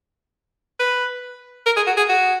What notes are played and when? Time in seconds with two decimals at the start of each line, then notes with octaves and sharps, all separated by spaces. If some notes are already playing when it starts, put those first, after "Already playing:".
0.80 B4
1.66 A#4
1.76 G#4
1.87 F#4
1.97 G#4
2.09 F#4